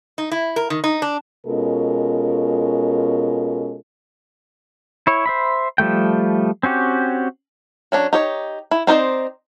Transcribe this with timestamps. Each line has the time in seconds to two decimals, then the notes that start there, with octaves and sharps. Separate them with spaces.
0.18 D#4
0.31 E4
0.56 A#4
0.70 D#3
0.84 D#4
1.02 D4
1.47 B2 G#3 C#4 F4 A4 A#4
5.07 E4 C#5
5.26 C5 E5 B5
5.78 F3 G3 A3 G5
6.63 C4 C#4 F#4 G4
7.92 F#3 C#4 D4
8.13 D#4 G4 C#5
8.71 E4
8.87 C4 D#4 F4 C5 D5